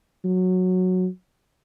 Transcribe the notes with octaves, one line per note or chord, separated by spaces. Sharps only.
F#3